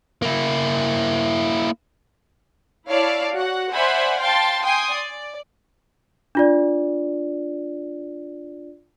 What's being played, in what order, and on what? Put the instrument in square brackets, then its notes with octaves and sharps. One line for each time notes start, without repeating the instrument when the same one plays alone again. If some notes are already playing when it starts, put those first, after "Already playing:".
[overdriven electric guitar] A#3 E4
[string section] E4 C#5 D5 F5 A5
F#4 F#5
C5 D5 E5 F#5 G#5 B5
F5 G5 A5 C6 A6
G5 G#5 C6 D#6
D5
[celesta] D4 F4 D5